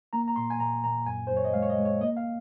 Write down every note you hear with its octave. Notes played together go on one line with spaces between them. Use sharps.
A#3 A#5
A#5
A#2 C6
G#5
A#2 A#5
A#2 A#5
F#2 G#5
C5
F#2
C#5
D#5
G#3 F5
C#5
D#5
G#3
C#5
A#3 D#5
F5